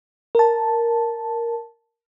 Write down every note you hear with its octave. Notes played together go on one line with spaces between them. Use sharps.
A#4 A5